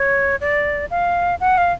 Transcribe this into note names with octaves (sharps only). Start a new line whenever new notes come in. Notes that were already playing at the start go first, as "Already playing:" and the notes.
Already playing: C#5
D5
F5
F#5
F5